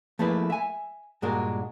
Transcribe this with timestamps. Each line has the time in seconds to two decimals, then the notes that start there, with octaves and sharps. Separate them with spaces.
0.19 F3 A3 A#3 E4 G#4 B4
0.50 E5 G#5
1.22 G2 A#2 G#3 D4 F#4 A#4